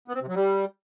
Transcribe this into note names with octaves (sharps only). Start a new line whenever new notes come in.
B3
C4
C3
F#3
G3